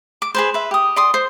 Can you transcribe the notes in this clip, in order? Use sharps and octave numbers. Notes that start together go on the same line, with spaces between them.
D6
G#4 B4 C5
B4 E5
G4 D#6
D5 C6 D#6
C5